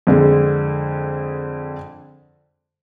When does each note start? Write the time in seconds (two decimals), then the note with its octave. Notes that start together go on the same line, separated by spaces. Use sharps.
0.07 F2 D3 G#3